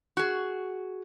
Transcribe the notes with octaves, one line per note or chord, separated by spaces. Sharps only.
F#4 G#4